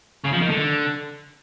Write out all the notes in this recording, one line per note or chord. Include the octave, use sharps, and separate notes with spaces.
C#3
F3
D#3
D3